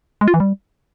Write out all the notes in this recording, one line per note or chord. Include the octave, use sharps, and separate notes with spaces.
G#3
F4
E3
G3